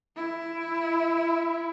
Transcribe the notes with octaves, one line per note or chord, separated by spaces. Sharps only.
E4